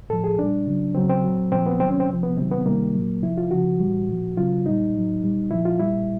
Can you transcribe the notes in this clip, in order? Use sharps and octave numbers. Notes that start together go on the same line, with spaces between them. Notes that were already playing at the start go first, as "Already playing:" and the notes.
A2 F3 A4
G#4
A#2 G3 D4
C#3 F#3
C#3 F#3 C4
C4
A#2 F#3
A#2 F3 C4
B3
C3 D#3 F#3 C4
C#4
C4
C3 F3
B3
C3 D#3 F#3 C4
B3
C3 D#3 G3 A#3
A#2 F#3
C3 F3 E4
F4
C#3 F3 F#4
A2 E3 G3
A#2 F3
C#3 F#3 F4
A#2 G3 D#4
A2 F#3
A#2 G3
A#2 F3 E4
F4
A#2 G3 E4